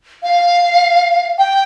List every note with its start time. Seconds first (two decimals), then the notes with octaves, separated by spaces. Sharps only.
0.23 F5
1.38 G5